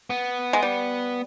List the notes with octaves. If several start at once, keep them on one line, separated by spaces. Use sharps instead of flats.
B3
G#3
G3